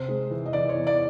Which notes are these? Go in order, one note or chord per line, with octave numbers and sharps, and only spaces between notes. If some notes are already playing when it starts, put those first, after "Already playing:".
Already playing: C3 C5
G#3
E3
D#5
E3 D5
C#5
E2
D5